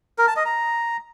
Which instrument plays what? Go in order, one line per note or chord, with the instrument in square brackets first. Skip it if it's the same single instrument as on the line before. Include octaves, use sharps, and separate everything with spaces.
[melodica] A#4
A5
D#5
A#5